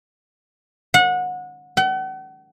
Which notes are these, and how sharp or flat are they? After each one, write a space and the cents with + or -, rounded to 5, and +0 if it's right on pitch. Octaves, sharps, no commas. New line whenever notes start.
F#5 -25
F#5 +40